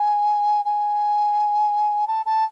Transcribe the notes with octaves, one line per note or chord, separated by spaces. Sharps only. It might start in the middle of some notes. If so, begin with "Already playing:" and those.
Already playing: G#5
G#5
A5
A5